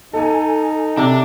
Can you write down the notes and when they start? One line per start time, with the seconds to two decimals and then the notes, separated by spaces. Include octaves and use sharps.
0.13 D#4 A4 G#5
0.97 C3 D4